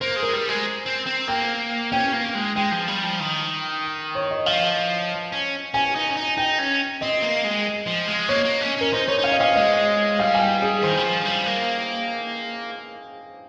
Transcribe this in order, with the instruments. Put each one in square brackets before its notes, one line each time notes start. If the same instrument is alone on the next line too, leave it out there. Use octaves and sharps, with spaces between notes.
[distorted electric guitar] A#3 [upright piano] C5
[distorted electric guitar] G#3
[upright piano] A#4
[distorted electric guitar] G3
G#3
C4
C4
[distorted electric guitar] A#3 [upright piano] G5
[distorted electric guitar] C#4 [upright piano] G5
[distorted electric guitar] A#3
G#3
[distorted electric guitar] G#3 [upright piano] G5
[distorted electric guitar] F3
G3
F3
D#3
[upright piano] C#5
D#5
[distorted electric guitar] F3 [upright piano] F5
[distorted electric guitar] C#4
[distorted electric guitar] C#4 [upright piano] G#5
[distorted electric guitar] D#4
C#4
D#4
[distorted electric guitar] D#4 [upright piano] G5
[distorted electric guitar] C#4
[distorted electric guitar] C4 [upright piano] D#5
[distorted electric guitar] A#3
G#3
F3
G#3
[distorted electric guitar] A#3 [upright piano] C#5
[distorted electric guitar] A#3
C#4
[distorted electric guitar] C#4 [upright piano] A#4
[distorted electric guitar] D#4 [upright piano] C5
[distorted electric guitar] D#4 [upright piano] C#5
[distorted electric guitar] D#4
[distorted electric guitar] C#4 [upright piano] F5
[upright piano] D#5
[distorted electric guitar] C#4 [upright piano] F5
[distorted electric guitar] G#3 [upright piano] D#5
[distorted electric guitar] G3 [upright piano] F5
[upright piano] G#5
G5
G#4
[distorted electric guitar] D#3 [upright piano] C5
[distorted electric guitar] G3
F3
G3
A#3